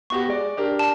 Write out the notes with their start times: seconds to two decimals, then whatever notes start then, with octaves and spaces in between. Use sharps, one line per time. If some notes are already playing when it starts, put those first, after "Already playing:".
0.10 B3 F#4 G4 C#6
0.27 G#3 D5
0.57 D4 G4 A#4
0.79 A5